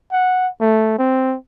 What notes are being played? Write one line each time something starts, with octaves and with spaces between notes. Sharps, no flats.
F#5
A3
C4